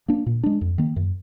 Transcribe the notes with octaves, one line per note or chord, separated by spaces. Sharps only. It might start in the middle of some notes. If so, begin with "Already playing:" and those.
A#3 D4
A#2
G#3 D4
F2
D#3 A#3
F#2